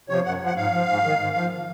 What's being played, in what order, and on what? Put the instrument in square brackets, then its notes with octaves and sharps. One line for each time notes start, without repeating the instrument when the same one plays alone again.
[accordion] C3 F3 C#5
F#2 F#5
F3 F#5
G#2 F5
F3
G#2
D#3
G#2
F3